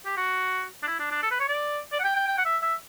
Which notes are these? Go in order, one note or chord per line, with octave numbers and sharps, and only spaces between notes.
G4
F#4
D4
E4
D4
D4
A4
B4
C#5
D5
D5
F#5
G5
G5
G5
F#5
E5
E5